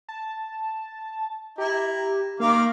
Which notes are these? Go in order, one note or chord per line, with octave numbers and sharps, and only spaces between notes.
A5
E4 G4 A#5
D#3 A#3 F5 D6